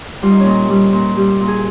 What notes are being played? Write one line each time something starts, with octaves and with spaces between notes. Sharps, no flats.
G3 F4
D#4
C#4
A#2 D#4
G3
A#2
G3 G4
A#2
G#4